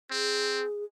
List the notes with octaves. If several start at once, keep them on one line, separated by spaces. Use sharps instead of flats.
C4 G#4